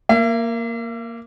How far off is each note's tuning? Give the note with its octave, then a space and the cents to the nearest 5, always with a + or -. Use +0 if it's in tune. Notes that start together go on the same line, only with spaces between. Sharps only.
A#3 +0 E5 +45